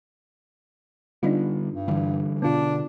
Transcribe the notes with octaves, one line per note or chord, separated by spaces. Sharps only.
D3 G3 B3 D4 D#4 F4
G2
D3 E3 G3
B2 D3 B3 D4 F4